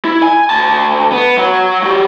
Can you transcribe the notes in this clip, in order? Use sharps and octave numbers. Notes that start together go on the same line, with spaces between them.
E4
G#5
D2 A5
B3
F#3 F#5
F#3 G4